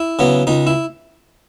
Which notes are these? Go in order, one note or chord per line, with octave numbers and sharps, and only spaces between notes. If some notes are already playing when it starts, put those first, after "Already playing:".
Already playing: E4
C#3 F#3 B3
C#2 D#4
E4